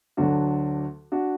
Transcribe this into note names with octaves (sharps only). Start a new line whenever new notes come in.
D2 D3 F#3 D4 F#4
D4 F#4